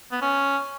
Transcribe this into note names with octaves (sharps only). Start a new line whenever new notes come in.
B3
C#4